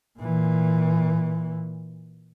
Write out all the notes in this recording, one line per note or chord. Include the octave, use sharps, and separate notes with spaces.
A#2 E3